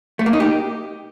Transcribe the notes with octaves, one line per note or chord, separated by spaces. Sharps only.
A3
A#3
D#4
G4